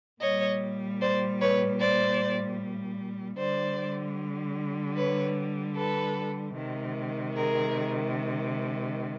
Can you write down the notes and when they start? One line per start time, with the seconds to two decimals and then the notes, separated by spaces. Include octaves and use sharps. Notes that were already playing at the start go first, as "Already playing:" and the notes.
0.21 A#2 G3 C#5 D#5
1.01 C5 D5
1.41 B4 C#5
1.80 C5 D5
3.39 D3 G3 C5 D5
4.97 B4 C#5
5.77 A4 B4
6.56 C3 D#3 G#3
7.35 G#4 A#4